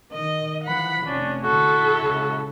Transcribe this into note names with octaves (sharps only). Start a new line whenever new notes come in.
D#3 D#5
E3 F3 F#5 B5
F1 C#4 D4
A#1 D3 E4 F#4 A4
C#2 C#3 F#4